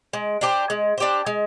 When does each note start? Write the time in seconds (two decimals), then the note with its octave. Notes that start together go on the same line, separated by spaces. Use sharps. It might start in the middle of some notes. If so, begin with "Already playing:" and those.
0.13 G#3
0.41 D4 G4 C5
0.70 G#3
0.98 D4 G4 C5
1.26 G#3